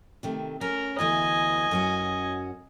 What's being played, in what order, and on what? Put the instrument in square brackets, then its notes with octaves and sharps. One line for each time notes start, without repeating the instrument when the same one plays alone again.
[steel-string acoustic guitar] C3 D#3 A3
[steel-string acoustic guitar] C#4 [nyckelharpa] A#4
[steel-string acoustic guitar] D2 E3 B3 [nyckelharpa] D#5 G#5
[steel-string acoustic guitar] F#2 C#4 F#4